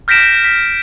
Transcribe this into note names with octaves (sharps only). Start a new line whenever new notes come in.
F6 G6 A#6 B6 D7 E7
B6